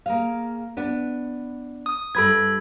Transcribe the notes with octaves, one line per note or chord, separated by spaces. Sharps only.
A#3 G#4 F5
B3 D4 B4
D#6
G2 G3 A4 B4 B5 G#6